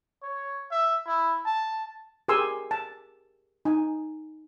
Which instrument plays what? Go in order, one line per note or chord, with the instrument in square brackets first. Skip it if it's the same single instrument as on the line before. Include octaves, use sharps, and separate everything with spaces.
[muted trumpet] C#5
E5
E4
A5
[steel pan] G4 G#4 A#4 G#5 C6 E6
A5
D#4 G#5